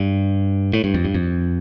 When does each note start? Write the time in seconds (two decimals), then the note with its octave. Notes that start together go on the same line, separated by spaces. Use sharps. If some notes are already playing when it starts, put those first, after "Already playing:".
Already playing: G2
0.73 A2
0.84 G2
0.94 F2
1.05 G2
1.14 F2